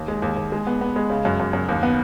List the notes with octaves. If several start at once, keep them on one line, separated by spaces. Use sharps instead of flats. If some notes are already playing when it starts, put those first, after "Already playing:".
Already playing: D#2
G#3
D#2
D#2
G#3
B3
B3
G#3
C#3
F#2
F#2
F#2
D#2
B3